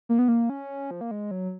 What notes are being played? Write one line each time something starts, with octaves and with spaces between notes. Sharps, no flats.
A#3
B3
A#3
C#4
F3
A#3
G#3
F#3